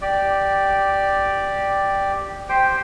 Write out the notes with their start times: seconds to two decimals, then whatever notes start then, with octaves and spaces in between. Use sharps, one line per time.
0.01 G4 D5
2.49 G4 C5 G5